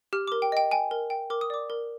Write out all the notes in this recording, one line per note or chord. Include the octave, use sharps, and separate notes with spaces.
G4 F6
D6
A#4
G5
D#5 G5
G5 G#5
A#4
G5
A#4 D6
D#6
D5 D6
A#4